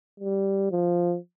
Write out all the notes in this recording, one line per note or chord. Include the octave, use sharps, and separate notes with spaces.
G3
F3